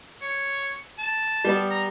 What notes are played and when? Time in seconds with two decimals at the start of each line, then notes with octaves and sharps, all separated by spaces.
0.22 C#5
0.99 A5
1.44 G3 B3
1.71 A#5